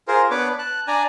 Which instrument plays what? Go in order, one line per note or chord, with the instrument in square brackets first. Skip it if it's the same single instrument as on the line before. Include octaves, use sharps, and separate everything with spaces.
[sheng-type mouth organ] F4 G#4 A#4 C5
B3 D4 B4 C#5 D6
A5 F#6
D4 D5 G#5 A#5